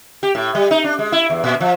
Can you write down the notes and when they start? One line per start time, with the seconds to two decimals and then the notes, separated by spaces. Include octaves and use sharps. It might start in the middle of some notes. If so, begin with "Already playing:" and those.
0.23 G4
0.35 A2
0.55 G3
0.71 D#4
0.84 D4
0.99 G#3
1.12 E4
1.30 E2
1.44 A#2
1.61 F3